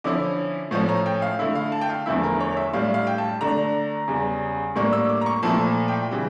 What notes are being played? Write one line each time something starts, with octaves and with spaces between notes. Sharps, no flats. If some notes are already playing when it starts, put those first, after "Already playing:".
D3 F3 C#4 E4 D6
A2 F3 A3 C#4
A#5
G5
F5
D3 A3 E4 E5
F5
A5
G5
F5
E2 D3 F3 A3 E4 E5
A#4
C#5
E5
A2 G3 D4 F5
F5
G5
A5
D3 A3 D4 A#5
E2 C#3 G3
A2 G3 A#3 D4 C#6
E6
D6
A#5
C#6
A#2 F3 A3 E4 A5
G5
C#3 E3 G3 D4